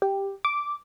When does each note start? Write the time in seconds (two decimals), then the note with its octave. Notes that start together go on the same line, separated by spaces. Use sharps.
0.02 G4
0.45 D6